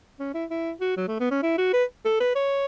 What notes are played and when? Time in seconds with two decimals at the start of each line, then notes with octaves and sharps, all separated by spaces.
0.19 C#4
0.34 E4
0.50 E4
0.81 F#4
0.97 F#3
1.08 A3
1.20 B3
1.31 C#4
1.42 E4
1.58 F#4
1.73 B4
2.05 A4
2.20 B4
2.35 C#5